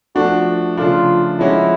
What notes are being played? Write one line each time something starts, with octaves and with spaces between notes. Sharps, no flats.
F3 A3 D4 F#4
C#3 F3 A3 D4 F4
F3 G#3 C#4 E4 F#4